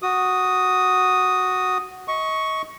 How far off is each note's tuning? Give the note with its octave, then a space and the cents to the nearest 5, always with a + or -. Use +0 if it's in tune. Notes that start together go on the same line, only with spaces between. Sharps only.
F#4 +0 D#6 +0
D#5 +30 C#6 +0